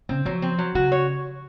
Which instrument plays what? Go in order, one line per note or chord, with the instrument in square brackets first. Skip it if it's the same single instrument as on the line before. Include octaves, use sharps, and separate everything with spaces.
[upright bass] C#3 [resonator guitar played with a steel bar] C4
[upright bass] F3 [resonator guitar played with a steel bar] F#3
[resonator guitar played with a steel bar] C4
F#3
[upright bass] C#3 [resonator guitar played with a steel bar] F#4
[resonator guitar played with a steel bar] C#5